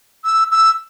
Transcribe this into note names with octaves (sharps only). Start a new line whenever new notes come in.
E6
E6